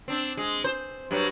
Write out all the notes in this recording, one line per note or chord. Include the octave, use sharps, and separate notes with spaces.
C4 D4
G#3
C5
G2 F#3 G3